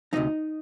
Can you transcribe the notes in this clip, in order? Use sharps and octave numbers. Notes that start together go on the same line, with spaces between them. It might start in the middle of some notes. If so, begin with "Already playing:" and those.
D2 C3 G3 D#4 D#5